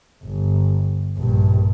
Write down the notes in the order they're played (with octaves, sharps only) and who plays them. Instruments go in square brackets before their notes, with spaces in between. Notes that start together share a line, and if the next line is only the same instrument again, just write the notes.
[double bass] G1
A#1 G2